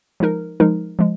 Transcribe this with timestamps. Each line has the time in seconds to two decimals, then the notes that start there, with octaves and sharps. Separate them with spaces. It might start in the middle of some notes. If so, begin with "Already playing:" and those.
0.20 F3 G#3 D#4 A#4
0.60 F3 G#3 D#4 A#4
0.99 F3 G#3